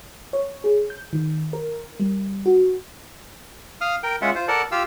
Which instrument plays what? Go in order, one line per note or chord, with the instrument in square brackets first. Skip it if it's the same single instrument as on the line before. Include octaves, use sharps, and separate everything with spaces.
[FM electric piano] C#5
G#4
G6
D#3
A#4
G3
F#4
[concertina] F5 D#6 F6
A#4 G5
G#3 C#4 F4 E5 F#5
F4 C5
A4 A#4 D5 F#5 A5
F4 G4 F5 E6